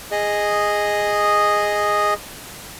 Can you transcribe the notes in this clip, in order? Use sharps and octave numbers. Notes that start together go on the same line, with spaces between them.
G#4 D#5